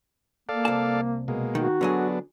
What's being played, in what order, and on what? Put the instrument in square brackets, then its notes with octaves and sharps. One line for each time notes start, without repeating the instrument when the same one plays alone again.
[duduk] A#3 [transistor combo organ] A4 D5 F5
[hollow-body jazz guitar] C2 A5
[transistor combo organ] B2 G#3 A#3
[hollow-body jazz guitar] D#3 [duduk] F#4
[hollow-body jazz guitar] D3 F#3 G#4 [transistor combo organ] B3 D4